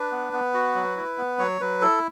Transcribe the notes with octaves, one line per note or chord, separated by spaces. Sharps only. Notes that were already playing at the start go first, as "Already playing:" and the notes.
Already playing: D4 B4
B3
B3
F#4
F#3
E4
B3
F#3 C#5
F#3 B4
E4 A4